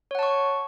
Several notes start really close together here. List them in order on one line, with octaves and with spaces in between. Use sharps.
C#5 F#5 A5 C#6